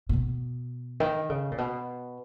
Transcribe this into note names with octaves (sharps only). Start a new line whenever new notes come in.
A#2
B2
D#3
C#3
A#2
B2